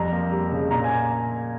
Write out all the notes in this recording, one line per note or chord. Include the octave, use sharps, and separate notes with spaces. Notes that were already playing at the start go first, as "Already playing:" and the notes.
Already playing: F2 G3 A#5
A#3
G3
C#3
A#2 A#5
G#5